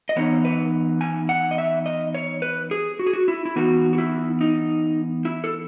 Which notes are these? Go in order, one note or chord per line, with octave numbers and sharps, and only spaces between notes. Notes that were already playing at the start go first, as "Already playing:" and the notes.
D#5
E3 B3 D#4 C#5
B4
G#5
F#5
D#5
E5
D#5
C#5
B4
G#4
F#4
G#4
F#4
E4
E4
E3 B3 D#4 F#4
F#4
E4
D#4
E4
A4